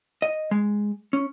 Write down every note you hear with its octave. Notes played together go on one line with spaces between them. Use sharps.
D#5
G#3
C#4